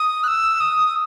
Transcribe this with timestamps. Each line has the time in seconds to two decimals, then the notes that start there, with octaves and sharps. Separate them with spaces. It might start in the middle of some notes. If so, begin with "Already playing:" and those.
Already playing: D#6
0.24 F#6
0.28 E6
0.60 D#6